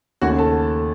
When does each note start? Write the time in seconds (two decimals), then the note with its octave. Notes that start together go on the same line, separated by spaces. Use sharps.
0.21 D#2 C#3 A3 F#4 F#5
0.38 A4 A5